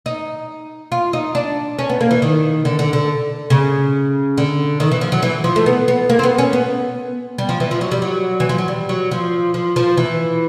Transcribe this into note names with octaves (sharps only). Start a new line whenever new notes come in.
D#4
F4
D#4
D4
C#4
B3
A#3
E3
D#3
D3
D3
D3
C#3
D3
D#3
E3
F3
F#3
E3
F3
A3
B3
B3
A#3
C4
B3
C#4
B3
G3
F3
E3
F3
F#3
G3
F#3
E3
F3
F#3
G3
F#3
F3
F3
F3
E3